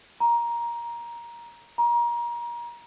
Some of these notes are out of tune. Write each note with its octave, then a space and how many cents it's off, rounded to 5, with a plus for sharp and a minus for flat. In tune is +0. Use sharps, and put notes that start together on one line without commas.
A#5 +15
A#5 +30